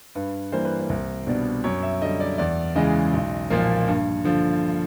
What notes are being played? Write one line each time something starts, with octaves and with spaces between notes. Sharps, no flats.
G2 B4
E3 G3 A#3 C5
B4
C5
C2
B2 G3 B3 D4
F#2 C#5
E5
D3 G3 D#5
D5
E2 D5
C#3 E3 G#3 D#5
B1
A#2 F3 A#3
G2
D3 F3